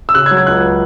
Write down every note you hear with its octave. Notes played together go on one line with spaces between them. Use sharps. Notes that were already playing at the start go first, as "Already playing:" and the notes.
E6
C#3 F#6
G#6
F#3
G#6
C#2 F#6